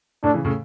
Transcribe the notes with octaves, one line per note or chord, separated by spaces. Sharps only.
A2 D4
C#3 E3
A2 C#3